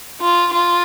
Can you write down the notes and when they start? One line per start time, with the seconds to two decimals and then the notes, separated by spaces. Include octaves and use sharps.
0.21 F4
0.53 F4